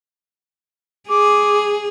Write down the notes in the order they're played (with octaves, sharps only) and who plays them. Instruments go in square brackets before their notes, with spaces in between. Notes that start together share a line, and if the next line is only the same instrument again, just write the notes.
[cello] G#4 [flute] D6